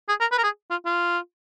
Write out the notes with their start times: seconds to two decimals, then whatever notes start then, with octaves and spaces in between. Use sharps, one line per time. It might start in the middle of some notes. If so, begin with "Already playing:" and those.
0.09 G#4
0.20 A#4
0.32 B4
0.38 A#4
0.44 G#4
0.71 F4
0.86 F4